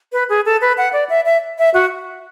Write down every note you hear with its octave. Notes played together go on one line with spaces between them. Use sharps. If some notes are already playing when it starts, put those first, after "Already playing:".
B4
G#4
A4
B4
F#5
D5
E5
E5
E5
F#4